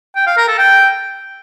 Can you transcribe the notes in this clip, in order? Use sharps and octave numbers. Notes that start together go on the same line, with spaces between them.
G5
F5
A#4
A4
G5